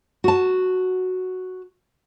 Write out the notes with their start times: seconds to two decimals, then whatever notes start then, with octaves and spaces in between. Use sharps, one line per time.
0.24 F#4 A5